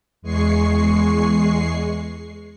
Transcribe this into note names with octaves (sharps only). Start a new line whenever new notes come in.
E2 G#3 G#4 C#6 C7